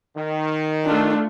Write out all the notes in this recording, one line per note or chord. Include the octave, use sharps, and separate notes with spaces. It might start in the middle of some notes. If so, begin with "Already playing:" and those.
D#3
A3 D4 F4